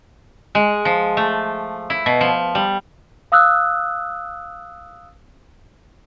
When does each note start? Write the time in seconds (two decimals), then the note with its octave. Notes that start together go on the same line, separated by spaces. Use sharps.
0.55 G#3
0.85 F3
1.17 A3
1.90 E4
2.06 B2
2.21 F3
2.55 G3
3.32 F5 D#6 E6 F#6